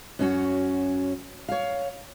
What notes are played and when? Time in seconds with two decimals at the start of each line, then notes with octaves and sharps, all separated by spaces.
0.19 F#2 C#4 F#4
1.49 C#5 F5